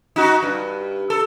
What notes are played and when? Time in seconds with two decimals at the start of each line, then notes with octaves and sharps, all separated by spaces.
0.16 D#4 F#4
0.43 G2
1.10 A4